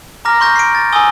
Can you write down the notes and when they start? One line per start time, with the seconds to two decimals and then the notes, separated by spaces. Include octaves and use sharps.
0.25 A#5 D6 F6 A#6
0.40 C6 C#6 G6 A#6
0.56 C7 D7
0.75 A6
0.93 G#5 D#6 E6 G7